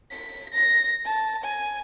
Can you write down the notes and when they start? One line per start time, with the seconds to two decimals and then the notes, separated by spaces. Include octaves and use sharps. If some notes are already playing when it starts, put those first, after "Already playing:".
0.11 B6
0.54 A#6
1.05 A5
1.44 G#5